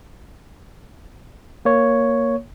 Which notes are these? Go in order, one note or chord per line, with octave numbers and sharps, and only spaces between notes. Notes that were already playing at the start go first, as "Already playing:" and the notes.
A#3 C#5